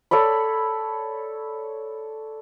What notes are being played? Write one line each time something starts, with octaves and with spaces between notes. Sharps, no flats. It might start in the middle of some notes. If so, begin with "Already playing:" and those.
A4 C#5 D5 B5